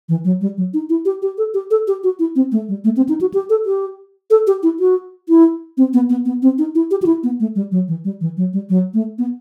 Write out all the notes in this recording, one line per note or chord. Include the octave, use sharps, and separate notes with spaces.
E3
F#3
G3
F#3
D#4
E4
G4
G4
A4
G4
A4
G4
F#4
E4
C4
A3
G3
A3
C4
D#4
F#4
G4
A4
G4
A4
G4
E4
F#4
E4
C4
B3
B3
B3
C4
D#4
E4
G4
F#4
E4
B3
A3
G3
F#3
E3
G3
E3
F#3
G3
F#3
A3
B3